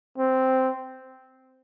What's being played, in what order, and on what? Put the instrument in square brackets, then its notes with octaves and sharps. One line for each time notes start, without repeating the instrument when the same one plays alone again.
[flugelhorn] C4